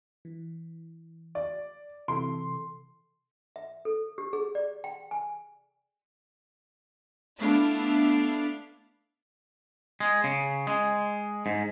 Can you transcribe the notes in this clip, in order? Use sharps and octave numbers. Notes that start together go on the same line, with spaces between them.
E3
D5
C3 E3 A4 C6
E5
A4
G4
G#4
D5
G5
G#5
A3 B3 D4 E4 F5
G#3
C#3
G#3
G#2